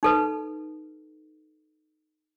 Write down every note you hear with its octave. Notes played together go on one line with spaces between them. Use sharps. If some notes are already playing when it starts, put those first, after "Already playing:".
D#4 A4 B4